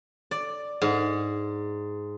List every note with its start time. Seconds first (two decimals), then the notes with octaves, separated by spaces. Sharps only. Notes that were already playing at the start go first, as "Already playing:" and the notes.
0.31 D5
0.82 G#2